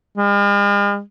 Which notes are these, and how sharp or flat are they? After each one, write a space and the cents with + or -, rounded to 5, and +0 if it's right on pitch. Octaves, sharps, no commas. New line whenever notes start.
G#3 -45